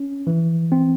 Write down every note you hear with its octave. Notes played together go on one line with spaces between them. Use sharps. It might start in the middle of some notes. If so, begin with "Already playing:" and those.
Already playing: C#4
E3
C4